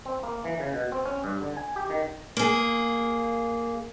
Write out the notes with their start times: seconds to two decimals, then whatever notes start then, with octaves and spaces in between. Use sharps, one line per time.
0.05 C4
0.23 A#3
0.44 E3
0.60 C#3
0.74 B2
0.92 C4
1.06 C#4
1.24 G2
1.41 D3
1.57 G#5
1.76 G4
1.90 D#3
2.37 A#3 G#4